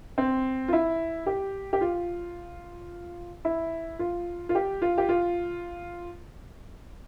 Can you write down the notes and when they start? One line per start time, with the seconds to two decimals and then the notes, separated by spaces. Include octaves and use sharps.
0.18 C4
0.68 F4
0.73 E4
1.26 G4
1.73 G4
1.81 F4
3.45 E4
3.99 F4
4.49 F4
4.55 G4
4.82 F4
4.98 G4
5.09 F4